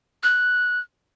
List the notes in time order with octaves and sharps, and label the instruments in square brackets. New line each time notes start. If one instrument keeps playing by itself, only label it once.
[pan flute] F#6